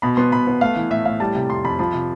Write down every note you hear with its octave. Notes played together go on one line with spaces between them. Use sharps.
B2 B5
B3 C6
B2 B5
B3
A3 F5
E3
A2 E5
A2 F5
G3 A5
C3
F2 C6
F2 B5
F3 B5
C3